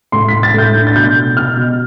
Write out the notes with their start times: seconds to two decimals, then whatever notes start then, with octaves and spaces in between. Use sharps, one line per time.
0.12 A2 C6
0.28 A2 B6
0.43 A6
0.54 A2 G6
0.75 D4
0.87 A6
0.95 B2 G6
1.16 B2
1.37 B2 F6
1.57 B2